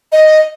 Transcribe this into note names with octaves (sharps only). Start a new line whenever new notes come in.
D#5